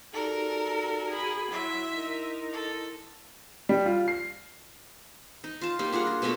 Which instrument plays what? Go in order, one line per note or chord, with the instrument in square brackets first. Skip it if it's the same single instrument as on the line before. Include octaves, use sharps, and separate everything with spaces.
[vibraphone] D#4 G4 D5 [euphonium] F#4 [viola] A4 [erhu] A#4
[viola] G#4 B5
[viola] F#3 [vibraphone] E4 C6 [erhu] E5
[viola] D#4 A#4
[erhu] A4
[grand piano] G3
F4
C7
[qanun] D#4
F4 A5
G3 A#3 D#4
D4 F4 G#4 F#5
A#4
B2 A3 B3 A4